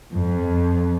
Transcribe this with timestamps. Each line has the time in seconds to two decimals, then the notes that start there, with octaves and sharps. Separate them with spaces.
0.13 F2